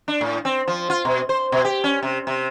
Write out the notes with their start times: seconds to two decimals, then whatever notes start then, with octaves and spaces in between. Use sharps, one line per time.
0.08 D4
0.21 A2
0.45 C4
0.68 F3
0.90 F4
1.05 B2
1.29 C5
1.52 B2
1.65 G4
1.84 C#4
2.03 C3
2.27 C3